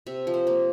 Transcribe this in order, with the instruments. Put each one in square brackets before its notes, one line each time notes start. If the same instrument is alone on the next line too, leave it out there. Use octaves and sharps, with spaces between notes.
[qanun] C3 E5
F3
C5
A#3